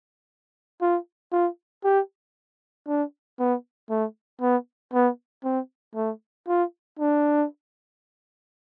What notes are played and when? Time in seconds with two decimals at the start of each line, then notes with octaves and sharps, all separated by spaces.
0.81 F4
1.32 F4
1.84 G4
2.87 D4
3.39 B3
3.90 A3
4.41 B3
4.94 B3
5.44 C4
5.95 A3
6.48 F4
6.99 D4